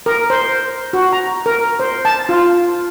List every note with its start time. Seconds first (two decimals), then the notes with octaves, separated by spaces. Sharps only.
0.06 A#4
0.30 C5
0.93 F#4
1.13 A#5
1.46 A#4
1.80 C5
2.05 A5
2.29 F4